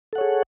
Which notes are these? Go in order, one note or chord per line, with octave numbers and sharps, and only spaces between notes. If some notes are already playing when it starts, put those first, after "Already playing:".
G#4 A4 C#5 F#5